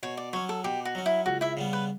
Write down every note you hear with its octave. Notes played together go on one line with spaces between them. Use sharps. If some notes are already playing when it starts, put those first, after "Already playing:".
B2 C#5
D5
F#3 C#4 C#5
A4
B2 G4
F#4
F#3 C#4
E4
C#2 F#4
E4 E5
C#3 G3 B3
B4